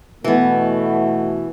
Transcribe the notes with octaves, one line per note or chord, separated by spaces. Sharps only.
B2 E3 A3 B3